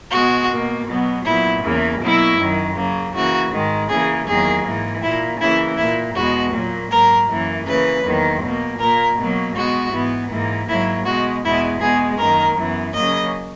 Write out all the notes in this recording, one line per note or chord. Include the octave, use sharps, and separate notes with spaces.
B2 G#3 B3 F#4
B2 A#3
B2 F#3 B3
A#2 F#3 B3 E4
E2 C#3 E3 A#3
B2 F#3 A#3 E4
F#2 D#3 F#3
C#3 F#3 A#3
C#3 E3 A#3 F#4
G#2 D#3 G#3
C#3 E3 A#3 G#4
E2 D#3 F#3 A#3 G#4
G#2 E3 A#3
A#2 A#3 E4
C#3 E3 A#3 E4
A#2 A#3 E4
E2 B2 G#3 B3 F#4
A#2 F#3 A#3
G#2 F#3 A#3 A#4
F#2 E3 A#3
C#3 E3 A#3 B4
E2 D#3 F#3 A#3
B2 A#3
A#2 A#3 A#4
B2 F#3 A#3
B2 G#3 B3 F#4
G#2 E3 B3
G#2 E3 A#3
G#2 F#3 A#3 E4
B2 G#3 B3 F#4
E2 B2 G#3 B3 E4
B2 G#3 B3 G#4
F#2 D#3 A#3 A#4
F#2 E3 B3
C#3 F#3 A#3 D#5